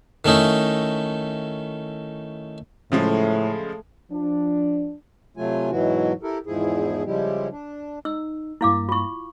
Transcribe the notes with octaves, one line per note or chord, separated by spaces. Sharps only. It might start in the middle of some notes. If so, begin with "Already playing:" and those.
D#3 A3 C#4 D#4 E4
A2 C#3 F3 G#3 A3
F3 D4
C3 F#3 A3 F4 G#5
G#2 B2 E3 F#3 E4 F#4
E4 G4 A4 A#4
E2 G#2 F3 E4 G#4
C#3 F3 G3 G#3 E4 G4
D4
D#4 E6
G2 A#3 E4 F5 D6
F4 C#6